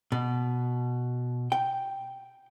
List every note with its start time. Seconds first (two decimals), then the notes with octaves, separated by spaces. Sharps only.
0.12 B2
1.52 G5